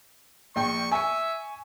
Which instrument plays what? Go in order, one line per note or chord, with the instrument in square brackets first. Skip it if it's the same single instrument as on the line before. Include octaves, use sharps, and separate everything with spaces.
[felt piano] A#1 G5 [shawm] C#6
[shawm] E5 [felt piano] G#5 C#6